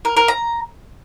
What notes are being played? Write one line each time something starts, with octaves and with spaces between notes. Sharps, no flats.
A#4
A#4
A#5